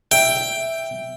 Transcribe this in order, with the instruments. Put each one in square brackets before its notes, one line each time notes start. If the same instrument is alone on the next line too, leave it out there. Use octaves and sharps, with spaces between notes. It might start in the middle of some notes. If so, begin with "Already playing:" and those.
[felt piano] E5 [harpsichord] G5